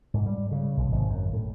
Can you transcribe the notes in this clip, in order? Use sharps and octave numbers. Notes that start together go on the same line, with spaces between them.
G#2
G3
C#3
B1
G#1
F#2
A2